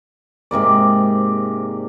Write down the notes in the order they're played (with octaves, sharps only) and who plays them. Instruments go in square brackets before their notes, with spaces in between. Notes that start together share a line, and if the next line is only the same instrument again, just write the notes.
[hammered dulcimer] G#2 C3 A#3 D5